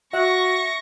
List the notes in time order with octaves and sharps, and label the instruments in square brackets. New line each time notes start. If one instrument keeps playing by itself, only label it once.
[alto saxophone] F#4 [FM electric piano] E5 [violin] C#6 A#6